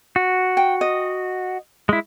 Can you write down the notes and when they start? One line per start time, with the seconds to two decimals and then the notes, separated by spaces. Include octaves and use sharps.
0.16 F#4
0.57 G5
0.81 D#5
1.89 G#3 E4